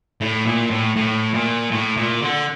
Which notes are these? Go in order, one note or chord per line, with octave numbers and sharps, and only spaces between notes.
A2
A#2
A2
A2
A#2
A2
A#2
D3